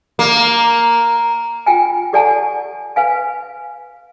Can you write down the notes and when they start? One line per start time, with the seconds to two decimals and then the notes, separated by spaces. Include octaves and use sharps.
0.19 A#3
1.66 F4 G5 G#5
2.13 G4 A4 D5 F#5 G#5 A5
2.96 B4 F5 G#5